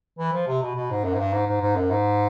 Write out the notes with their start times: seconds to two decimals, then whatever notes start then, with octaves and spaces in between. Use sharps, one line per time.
0.19 E3
0.33 F3
0.47 C3
0.62 B2
0.75 B2
0.90 G#2
1.04 F#2
1.14 G#2
1.19 G2
1.33 G#2
1.47 G#2
1.61 G#2
1.76 F#2
1.90 G#2